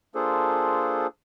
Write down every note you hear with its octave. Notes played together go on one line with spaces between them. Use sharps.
A#3 D4 F4 G#4 A4 C5